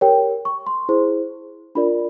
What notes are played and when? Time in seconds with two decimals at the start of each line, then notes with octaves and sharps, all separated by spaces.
0.01 G4 A#4 C#5 G5
0.45 C#6
0.67 C6
0.89 E4 G#4 C5
1.75 D4 F4 A#4 D5 B5